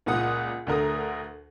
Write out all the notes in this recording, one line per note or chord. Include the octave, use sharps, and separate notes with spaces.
C#2 A#2 F4 F#5 D#6
D2 D3 A#4 D#6